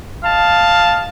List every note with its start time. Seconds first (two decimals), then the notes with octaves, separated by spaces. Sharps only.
0.23 D#5 F5 A5